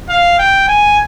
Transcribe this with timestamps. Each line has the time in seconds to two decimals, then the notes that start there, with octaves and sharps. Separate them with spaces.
0.09 F5
0.39 G5
0.68 G#5